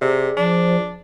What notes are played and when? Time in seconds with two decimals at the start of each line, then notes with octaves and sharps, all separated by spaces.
0.01 C3 G#4 D5
0.37 F3 D4